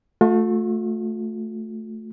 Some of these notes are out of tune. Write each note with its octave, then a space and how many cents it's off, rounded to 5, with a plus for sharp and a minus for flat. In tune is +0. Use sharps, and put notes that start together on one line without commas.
A3 +0 F4 +45